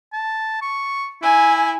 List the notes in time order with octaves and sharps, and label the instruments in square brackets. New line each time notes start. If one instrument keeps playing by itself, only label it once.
[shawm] A5
C#6
[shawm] E4 [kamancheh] G#5